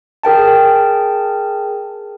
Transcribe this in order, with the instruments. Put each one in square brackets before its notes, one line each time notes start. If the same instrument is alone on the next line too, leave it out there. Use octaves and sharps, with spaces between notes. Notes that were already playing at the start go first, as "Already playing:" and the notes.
[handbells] G#4 A#4 G5 A5